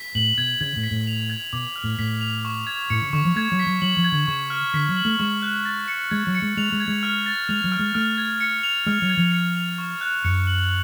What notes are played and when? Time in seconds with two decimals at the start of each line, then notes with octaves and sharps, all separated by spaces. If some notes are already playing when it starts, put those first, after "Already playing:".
Already playing: B6
0.15 A2 F#7
0.38 B2 G#6
0.61 C#3 G#6
0.76 A2
0.83 B6
0.91 A2
1.07 F7
1.30 G#6
1.53 B2 D6
1.76 F6
1.84 A2
1.99 A2 B6
2.21 F7
2.45 C#6
2.67 G#6
2.90 A2 C#7
3.02 C#3
3.13 D3 C#6
3.25 F3
3.36 A3 G#6
3.52 F#3
3.59 B6
3.67 F#3
3.82 F#3 F#7
3.97 F3
4.04 G#6
4.12 D3
4.27 C#3 C#6
4.50 F6
4.74 D3 B6
4.89 F#3
4.97 F#7
5.05 A3
5.19 G#3 C#6
5.42 F#6
5.65 A6
5.88 C#7
6.11 G#3 G#6
6.27 F#3
6.35 C#7
6.42 G#3
6.57 G#3 F7
6.72 G#3
6.80 G#6
6.88 G#3
7.03 F6
7.26 A6
7.49 G#3 F7
7.64 F#3
7.72 F6
7.79 G#3
7.95 A3 F6
8.18 G#6
8.40 C#7
8.63 F7
8.86 G#3 F6
9.02 F#3
9.10 G#6
9.17 F3
9.32 C#7
9.55 F7
9.78 C#6
10.01 F#6
10.24 F#2 C#7
10.47 F#7